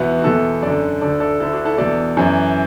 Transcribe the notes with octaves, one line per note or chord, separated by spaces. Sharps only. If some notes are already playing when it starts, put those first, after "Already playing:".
Already playing: E2 B2 B3 E4
F#4
E2 B2 E4 A4
F#2 A4 D5
D3
D2 D3 A4 D5
A4 D5
D2 D3 E4 A4
D4 F#4
E4 A4
E2 B2 A4 D5
F#2 E3